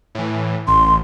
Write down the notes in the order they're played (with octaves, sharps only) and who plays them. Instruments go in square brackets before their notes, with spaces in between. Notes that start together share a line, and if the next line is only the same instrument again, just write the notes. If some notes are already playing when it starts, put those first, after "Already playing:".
[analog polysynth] A2 E3
[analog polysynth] A1 [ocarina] C6